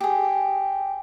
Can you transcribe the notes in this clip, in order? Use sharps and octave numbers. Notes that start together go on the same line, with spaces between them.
G4 G#4